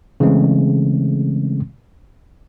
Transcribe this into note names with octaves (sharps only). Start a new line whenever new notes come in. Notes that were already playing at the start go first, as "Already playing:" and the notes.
C#3 E3 G#3 A3 C4